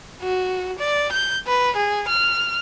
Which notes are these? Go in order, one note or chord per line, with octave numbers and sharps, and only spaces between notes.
F#4
D5
G6
B4
G#4
F6